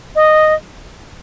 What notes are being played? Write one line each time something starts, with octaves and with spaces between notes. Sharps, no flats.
D#5